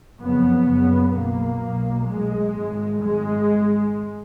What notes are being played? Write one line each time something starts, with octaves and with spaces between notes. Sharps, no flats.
F#1 F2 C#3 B3
F#1 F#2 C#3
B1 B2 A#3
B1 B2
B1 A#2 G#3
G#1 G#2
G#1 G#2 G#3